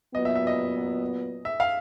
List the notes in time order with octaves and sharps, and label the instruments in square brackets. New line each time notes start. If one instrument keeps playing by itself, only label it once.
[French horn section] A#2 F#3 B3 [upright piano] D#5
[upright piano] E5
E5
D#5
E5
F5